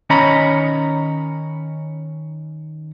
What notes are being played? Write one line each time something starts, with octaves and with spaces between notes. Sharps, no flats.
D#3 C#4 C#5 D#5 A#5 B5